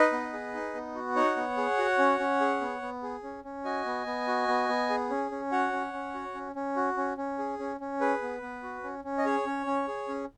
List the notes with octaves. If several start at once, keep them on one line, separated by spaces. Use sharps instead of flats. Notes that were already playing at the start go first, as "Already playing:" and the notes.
Already playing: D#4 B4 D#5
B3
G#4
D#4
B3
F#4
D#4 C#5 F#5
B3
G#4
F#4
C#4
C#4
G#4
B3
B3
G#4
C#4
C#4
F#4 D#5 G#5
B3
B3
F#4
B3
B3
G#4
C#4
C#4
F#4 C#5 F#5
C#4
C#4
F#4
C#4
C#4
F#4
C#4
C#4
G#4
C#4
C#4
G#4 B4
B3
B3
F#4
C#4
C#4
D#5
G#4 C#5
C#4
C#4
G#4
C#4